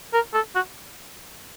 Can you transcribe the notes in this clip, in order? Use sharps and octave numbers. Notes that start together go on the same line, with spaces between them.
A#4
A4
F#4